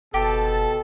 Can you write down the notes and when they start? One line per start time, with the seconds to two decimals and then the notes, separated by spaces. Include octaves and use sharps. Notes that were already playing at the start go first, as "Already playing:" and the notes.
0.14 F#1 B2 G4 A4 A5